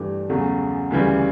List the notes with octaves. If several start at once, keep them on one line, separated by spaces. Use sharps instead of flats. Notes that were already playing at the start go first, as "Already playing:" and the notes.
Already playing: G2 E3 A3 D4 G4
E2 C#3 F#3 A3
D2 C#3 E3 G3